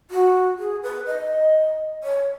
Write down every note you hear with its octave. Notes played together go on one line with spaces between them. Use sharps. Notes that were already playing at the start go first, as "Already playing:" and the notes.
F#4
G#4
B4
D#5
C#5